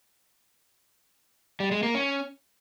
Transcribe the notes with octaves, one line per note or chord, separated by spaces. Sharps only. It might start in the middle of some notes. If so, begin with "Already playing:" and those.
G3
G#3
A#3
C#4